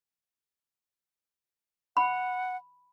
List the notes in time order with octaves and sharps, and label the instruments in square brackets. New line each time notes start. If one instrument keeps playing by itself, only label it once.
[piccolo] F#5 [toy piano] B5